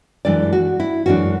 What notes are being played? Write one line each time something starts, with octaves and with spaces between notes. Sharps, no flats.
F#2 E3 G#3 D4 D5
F#4
E4
F#2 E3 G#3 D4 F#4